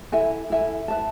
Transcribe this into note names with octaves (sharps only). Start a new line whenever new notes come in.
E4 A4 E5 G#5
E4 A4 E5 G#5
B4 E5 A5